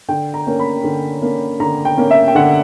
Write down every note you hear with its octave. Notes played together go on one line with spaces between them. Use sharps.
D3 G5
A#5
A#3 C#4
B5
D3
A#3 C#4
D3 A#5
G5
A#3 C#4
E5
G5
D3 F#5